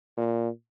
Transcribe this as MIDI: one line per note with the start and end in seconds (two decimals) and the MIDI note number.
0.17 0.49 46